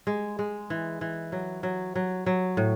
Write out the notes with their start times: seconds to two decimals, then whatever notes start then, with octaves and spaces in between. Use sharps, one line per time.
0.07 G#3
0.39 G#3
0.70 E3
1.01 E3
1.32 F#3
1.63 F#3
1.95 F#3
2.26 F#3
2.57 A2